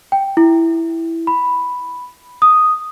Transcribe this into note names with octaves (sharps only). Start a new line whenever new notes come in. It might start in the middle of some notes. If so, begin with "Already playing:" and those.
G5
E4
B5
D#6